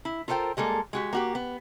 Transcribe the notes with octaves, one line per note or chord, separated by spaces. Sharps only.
E4
F4 A4 A#4 C5 G5
G3 G#3 A#3 A4
G#3 F#4 G4
A#3 F#4 G4
B3